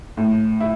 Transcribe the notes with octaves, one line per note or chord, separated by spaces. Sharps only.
A2
E4